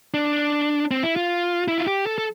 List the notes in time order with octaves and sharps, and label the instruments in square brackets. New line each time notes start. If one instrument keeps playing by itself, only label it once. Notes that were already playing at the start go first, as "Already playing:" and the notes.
[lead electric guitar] D4
C4
E4
F4
E4
F4
G4
A4
A4